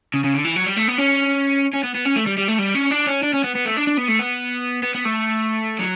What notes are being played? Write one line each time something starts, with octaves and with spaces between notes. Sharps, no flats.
C#3
C#3
D3
E3
F#3
G3
A3
B3
C#4
C#4
B3
B3
C#4
A3
G3
G3
A3
G3
C#4
D4
C#4
D4
C#4
B3
B3
A3
D4
D4
B3
A3
B3
B3
B3
A3
F#3